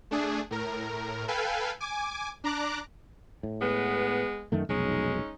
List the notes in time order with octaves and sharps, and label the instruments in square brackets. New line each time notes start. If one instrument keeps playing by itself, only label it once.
[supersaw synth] A3 D4 G#4
A2 A#4
A4 B4 F5 G5 G#5
G#5 D6
D4 A#5 D6 F#6
[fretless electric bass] A2
[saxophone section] G#3 B3
[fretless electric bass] F#2 D#3 A3
[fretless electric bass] F1 B1 [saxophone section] G#3 C#4 D#4